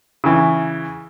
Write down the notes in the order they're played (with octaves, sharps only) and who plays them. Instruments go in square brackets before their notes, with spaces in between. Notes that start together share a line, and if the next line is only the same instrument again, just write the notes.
[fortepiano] C#3 E3